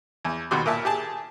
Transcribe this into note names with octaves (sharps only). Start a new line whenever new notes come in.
E2
D#2 B2 F#4 G4 C6 D6
A#2 A#4 E5 A5
G4 G#4 A5